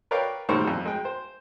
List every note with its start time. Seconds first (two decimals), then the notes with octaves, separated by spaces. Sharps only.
0.11 A#4 B4 C#5 D5 F5 G5
0.49 A#1 A2 D#3 G3 C5 C#6
0.68 F2
0.85 G#3 G5
1.05 C5